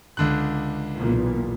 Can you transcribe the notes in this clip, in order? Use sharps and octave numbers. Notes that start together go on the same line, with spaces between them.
C#2 D3 F#6
B1 E2 A#2